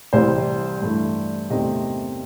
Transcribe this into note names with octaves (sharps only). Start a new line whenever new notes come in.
C2 C3 E3 G3 C5
G2 E3 A3
E2 C3 D#3 A3 C4 D#5